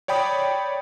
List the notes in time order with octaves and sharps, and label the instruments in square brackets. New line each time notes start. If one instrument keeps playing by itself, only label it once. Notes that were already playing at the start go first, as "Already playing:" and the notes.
[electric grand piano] C#5 D5 G5 B5 D#6